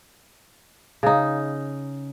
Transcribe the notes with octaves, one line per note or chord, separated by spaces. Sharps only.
C#3 D#4